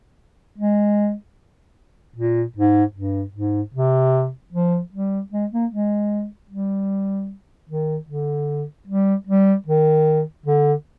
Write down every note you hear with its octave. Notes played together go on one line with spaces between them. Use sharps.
G#3
A#2
G#2
G2
G#2
C3
F3
G3
G#3
A#3
G#3
G3
D#3
D3
G3
G3
D#3
D3